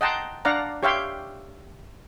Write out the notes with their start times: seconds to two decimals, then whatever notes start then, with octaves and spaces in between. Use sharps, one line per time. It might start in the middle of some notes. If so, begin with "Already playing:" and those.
0.01 D#5 F#5 G5 A5 A#5 C6
0.45 D4 D5 F5 F#5 A#5
0.83 G4 C#5 E5 F5 G5 C6